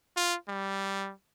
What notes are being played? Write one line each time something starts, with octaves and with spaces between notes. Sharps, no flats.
F4
G3